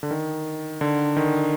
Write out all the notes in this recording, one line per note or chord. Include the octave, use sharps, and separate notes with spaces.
D3
D#3
D3
D#3